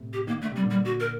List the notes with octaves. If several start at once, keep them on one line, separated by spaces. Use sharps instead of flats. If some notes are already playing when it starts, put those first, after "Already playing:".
Already playing: A2 C3
G4
D#3 A#3
D3 A3
C3 G3
A#2 D3
G3
F#4
A#4